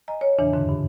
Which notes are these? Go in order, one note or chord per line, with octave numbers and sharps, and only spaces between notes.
D#5 G#5 A#5
C#5
E2 A#2 C#3 E3 D4
F2 G#2 D3
G2